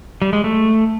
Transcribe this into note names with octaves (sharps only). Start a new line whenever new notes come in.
G3
G#3
A3